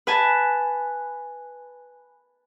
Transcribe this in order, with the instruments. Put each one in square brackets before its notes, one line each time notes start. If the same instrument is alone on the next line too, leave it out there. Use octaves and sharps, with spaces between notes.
[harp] B4 G#5 A5